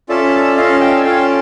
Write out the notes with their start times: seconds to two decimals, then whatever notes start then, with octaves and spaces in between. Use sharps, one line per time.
0.09 C#4 F4 A4 D5 E5
0.57 C#4 F4 A4 D#5 F5
0.81 F5 G5
0.98 G#5
1.04 C#4 F4 A4 F5 G5